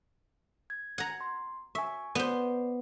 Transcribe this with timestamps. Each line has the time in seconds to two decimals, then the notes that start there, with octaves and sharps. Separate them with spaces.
0.70 G#6
0.98 F#5 A#5 G#6
1.21 C6
1.75 E5 G#5 C#6
2.15 B3 C5 D5